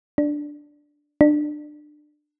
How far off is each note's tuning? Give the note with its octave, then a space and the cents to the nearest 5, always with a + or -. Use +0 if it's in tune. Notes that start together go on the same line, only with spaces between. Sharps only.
D4 +0
D4 +25